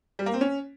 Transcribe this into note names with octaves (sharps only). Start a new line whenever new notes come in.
G3
A#3
C4
C#4